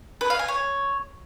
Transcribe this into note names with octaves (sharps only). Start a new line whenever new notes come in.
B4
F5
G#5
C#5